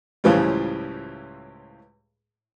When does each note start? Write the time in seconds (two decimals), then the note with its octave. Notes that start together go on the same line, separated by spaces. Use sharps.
0.24 C#2 A2 C#3 E3 F3 G3